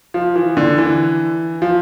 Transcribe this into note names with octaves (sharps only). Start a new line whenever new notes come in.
F3
E3
D3
E3
F3